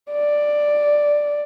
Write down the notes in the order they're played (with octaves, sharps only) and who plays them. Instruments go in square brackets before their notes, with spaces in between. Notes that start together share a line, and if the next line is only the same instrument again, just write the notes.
[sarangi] D5